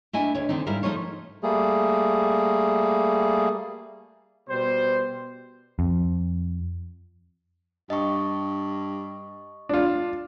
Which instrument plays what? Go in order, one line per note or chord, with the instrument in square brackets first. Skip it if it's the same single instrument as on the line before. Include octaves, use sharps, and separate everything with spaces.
[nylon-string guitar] A3 D4 E4 D#5 G#5
D2 C#5
D3 D#3 C4 D#4
G#2 G3 E4 A#4 F5
F3 A3 D#4 F4 C5 C#5
[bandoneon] G3 A3 A#3 G#4
[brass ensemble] B2 G3 C5
[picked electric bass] F2
[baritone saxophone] G2 [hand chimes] D#5 C#6
[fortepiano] D4 F4